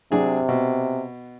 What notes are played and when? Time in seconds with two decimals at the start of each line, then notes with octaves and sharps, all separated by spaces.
0.12 C3 F#3 D4 G#4
0.49 B2